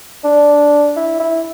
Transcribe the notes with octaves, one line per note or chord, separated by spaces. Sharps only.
D4
E4
E4